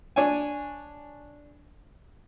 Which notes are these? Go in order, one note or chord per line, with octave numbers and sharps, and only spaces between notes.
D4 C#5 G#5